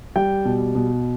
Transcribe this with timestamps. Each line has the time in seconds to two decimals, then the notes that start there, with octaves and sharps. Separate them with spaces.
0.16 G3 G5
0.45 B2
0.75 B2